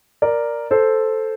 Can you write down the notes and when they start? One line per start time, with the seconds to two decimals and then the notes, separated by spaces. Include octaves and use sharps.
0.22 A#4 D5
0.71 A4 C5